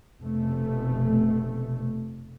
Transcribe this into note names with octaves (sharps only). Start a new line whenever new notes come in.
F1 B2 A3